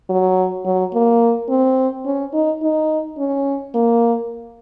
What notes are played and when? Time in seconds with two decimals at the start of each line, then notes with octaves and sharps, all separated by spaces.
0.10 F#3
0.65 F#3
0.94 A#3
1.49 C4
2.05 C#4
2.34 D#4
2.62 D#4
3.18 C#4
3.75 A#3